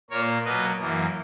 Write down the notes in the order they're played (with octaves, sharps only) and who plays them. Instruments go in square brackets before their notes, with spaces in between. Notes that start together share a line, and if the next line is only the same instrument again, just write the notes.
[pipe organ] A#2 A#3 A#4 C#5
B2 F#3 A#3 B4 D#5
F#2 E3 A#3